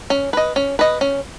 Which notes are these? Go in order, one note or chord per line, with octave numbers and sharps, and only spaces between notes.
C#4
B4 D#5
C#4
B4 D#5
C#4